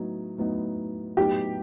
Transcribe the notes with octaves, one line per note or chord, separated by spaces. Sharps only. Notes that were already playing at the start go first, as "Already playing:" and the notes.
Already playing: A2 F#3 B3 D#4
A2 F#3 B3 D#4
A2 F#3 B3 D#4 G4